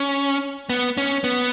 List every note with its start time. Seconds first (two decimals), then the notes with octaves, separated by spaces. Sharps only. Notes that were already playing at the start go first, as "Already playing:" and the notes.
Already playing: C#4
0.70 B3
0.97 C#4
1.24 B3